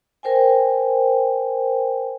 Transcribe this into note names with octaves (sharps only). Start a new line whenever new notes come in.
A#4 C5 G5 G#5